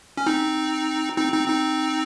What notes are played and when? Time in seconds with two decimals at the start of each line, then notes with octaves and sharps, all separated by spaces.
0.17 C#4
0.26 C4 D#4
1.17 C4 D#4
1.33 C4 D#4
1.48 C4 D#4